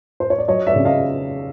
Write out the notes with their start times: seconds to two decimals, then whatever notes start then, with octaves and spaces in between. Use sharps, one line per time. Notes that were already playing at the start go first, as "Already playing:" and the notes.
0.20 C5
0.30 C#5
0.38 D5
0.48 F#3 C#5 D#5
0.67 D5 E5
0.76 C#3
0.85 D#5 F5